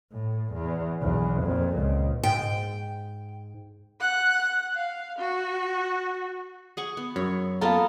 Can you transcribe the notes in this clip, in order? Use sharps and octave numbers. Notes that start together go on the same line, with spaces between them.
A2
E2
B1 E2
F2 A#2
C#2
G#2 G5
F#5 F#6
F5
F#4
G#4 F#5 C#6
B3
F#2 C#5
A#3 B3 F4 A4 F5 A#5